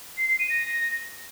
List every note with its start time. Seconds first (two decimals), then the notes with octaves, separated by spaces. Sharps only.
0.17 C7
0.28 C7
0.39 D#7
0.50 A#6